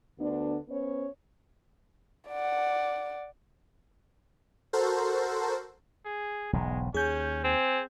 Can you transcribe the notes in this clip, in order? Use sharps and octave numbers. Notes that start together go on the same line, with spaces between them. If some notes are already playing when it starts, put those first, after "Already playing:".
D2 D3 B3 D4
B3 C#4 C5 C#5
D5 F#5
F#4 A4 A#4 C5
G#4
E1 B1 G#2 G#3
D#2 C#4 G#4 G6
C4 G#5